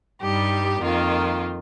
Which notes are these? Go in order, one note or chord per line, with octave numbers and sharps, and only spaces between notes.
G2 G3 D#4 G4
F2 D#3 A#3 F4